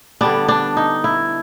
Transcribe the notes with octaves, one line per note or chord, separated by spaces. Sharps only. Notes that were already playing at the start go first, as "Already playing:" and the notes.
D3 G3 B3 D4
D4
D#4
E4